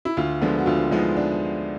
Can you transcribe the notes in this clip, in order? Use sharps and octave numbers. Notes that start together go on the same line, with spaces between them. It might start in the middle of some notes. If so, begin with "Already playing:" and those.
E4
D2 F4
D3 F3 G#3 B3
F#4
D2 F4
D3 F3 G#3 B3 D#4
D4